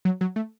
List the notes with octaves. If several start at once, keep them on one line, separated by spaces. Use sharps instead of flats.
F#3
F#3
A3